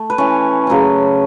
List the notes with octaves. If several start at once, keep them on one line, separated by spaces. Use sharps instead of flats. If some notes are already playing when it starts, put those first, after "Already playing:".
Already playing: A3
B4
E3 C#4 C#5
C#3 F#3 A3 C#4